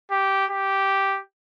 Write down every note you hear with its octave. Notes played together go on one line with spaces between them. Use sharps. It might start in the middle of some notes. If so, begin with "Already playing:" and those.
G4
G4